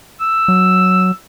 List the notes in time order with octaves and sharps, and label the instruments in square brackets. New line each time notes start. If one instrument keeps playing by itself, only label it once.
[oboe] E6
[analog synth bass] F#3